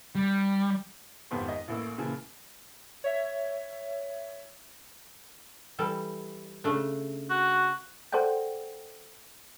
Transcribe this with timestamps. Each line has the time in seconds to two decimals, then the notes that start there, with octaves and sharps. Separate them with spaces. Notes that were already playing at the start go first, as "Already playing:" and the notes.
0.15 G3
1.31 G#1 F2 F3 B3 G4 C6
1.49 D#5
1.68 A1 A2 A#3 E6
1.98 A#2 C#3 E3 F3
3.04 C#5 E5
5.78 E3 G3 A4
6.64 C#3 A3 D4
7.30 F#4
8.12 A4 C5 D5 F#5 G5